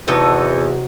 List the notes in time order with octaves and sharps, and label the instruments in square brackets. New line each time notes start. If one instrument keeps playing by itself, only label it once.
[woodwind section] E2 [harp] C3 [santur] F#3 D#4 F#4 [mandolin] A3 A4 D#5